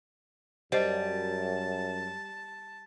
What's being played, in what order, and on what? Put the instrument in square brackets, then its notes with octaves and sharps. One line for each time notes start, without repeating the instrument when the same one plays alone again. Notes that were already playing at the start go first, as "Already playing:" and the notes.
[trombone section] F#2 [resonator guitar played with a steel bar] G3 [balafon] C5 D#5 [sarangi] A5